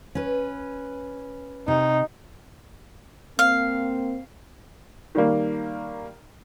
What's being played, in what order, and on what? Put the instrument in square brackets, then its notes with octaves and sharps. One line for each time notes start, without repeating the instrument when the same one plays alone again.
[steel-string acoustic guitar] C#4 B4
[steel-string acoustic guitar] C3 [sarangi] D#4
[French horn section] A#3 C4 [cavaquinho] F5
[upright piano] D#3 G3 A#3